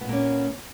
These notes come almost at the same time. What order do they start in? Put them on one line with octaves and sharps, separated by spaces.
B3 A#2 A#3 C#4